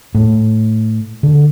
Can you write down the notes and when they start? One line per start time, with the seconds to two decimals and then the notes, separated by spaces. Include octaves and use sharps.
0.15 A2
1.23 D3